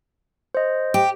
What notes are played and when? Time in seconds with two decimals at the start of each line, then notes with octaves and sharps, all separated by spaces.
0.55 C5 D#5
0.94 G4